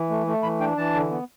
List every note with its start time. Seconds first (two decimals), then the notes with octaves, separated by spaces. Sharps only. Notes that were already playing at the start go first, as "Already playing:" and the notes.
Already playing: E3
0.10 A3
0.27 A3
0.43 E3 B5
0.60 D4 G5
0.77 E3 A5
0.94 D3
1.11 B3